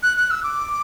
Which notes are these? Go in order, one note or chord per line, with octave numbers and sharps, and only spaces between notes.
F#6
F#6
E6
D6